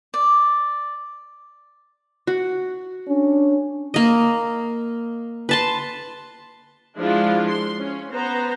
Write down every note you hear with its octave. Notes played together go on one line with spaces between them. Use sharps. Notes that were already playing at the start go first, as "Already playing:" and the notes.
D5
F#4
C#4 D4
A#3 D#5
B4 A5 C6
F3 G#3 D4 E4 F4
C6
C#4
B3 C5 A#5